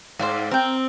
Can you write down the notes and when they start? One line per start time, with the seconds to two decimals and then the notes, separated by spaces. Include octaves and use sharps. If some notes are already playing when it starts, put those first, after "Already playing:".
0.19 G#2 C5 D5 F5
0.51 C4 A#4 G5